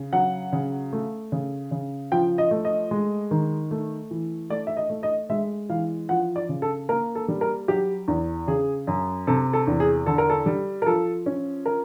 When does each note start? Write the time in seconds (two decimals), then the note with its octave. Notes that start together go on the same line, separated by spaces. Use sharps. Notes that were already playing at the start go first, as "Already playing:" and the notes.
Already playing: C#3
0.13 F#3 F#5
0.53 C#3
0.93 A3
1.32 C#3
1.71 C#3
2.12 F3 G5
2.38 D#5
2.51 A3
2.65 D#5
2.91 G#3
3.31 D#3
3.71 A3
4.11 E3
4.50 A3 D5
4.67 E5
4.77 D#5
4.90 A3
5.03 D#5
5.30 G#3 E5
5.69 E3 F5
6.09 F3 F#5
6.36 D5
6.49 C#3
6.62 A4
6.89 A#3 A#4
7.15 A4
7.28 G3
7.41 A#4
7.68 F#3 G4
8.08 E2
8.47 C#3 G#4
8.87 F#2
9.27 C3 A4
9.53 A4
9.67 E2
9.80 G#4
10.06 D3 A4
10.18 A#4
10.30 A4
10.46 G3
10.82 A#4
10.86 F3 A4
11.26 C#4
11.66 A#4